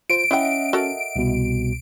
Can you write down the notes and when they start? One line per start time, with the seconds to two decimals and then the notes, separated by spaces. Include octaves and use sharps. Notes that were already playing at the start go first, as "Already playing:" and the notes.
0.10 F4 C5 D7
0.31 C#4 E4 D#5 E5 F#5 G5
0.73 F#4 A4 A#4
1.16 C2 B2